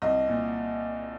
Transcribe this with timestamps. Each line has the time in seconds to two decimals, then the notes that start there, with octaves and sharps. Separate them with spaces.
0.02 C2 D#5
0.28 A#2